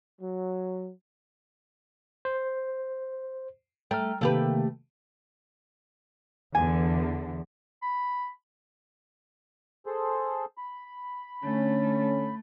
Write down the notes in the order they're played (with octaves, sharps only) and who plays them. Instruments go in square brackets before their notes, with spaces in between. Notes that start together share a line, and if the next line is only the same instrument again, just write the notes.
[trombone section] F#3
[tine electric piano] C5
[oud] A3 [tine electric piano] G5 A#5 F6
[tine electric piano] C3 D#3 A#3 [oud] A3 G4 B4
[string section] E2 D3 E3 [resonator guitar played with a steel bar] G#5
[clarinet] B5
[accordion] G#4 A4 C5
B5
[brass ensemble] D3 C#4 [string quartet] A3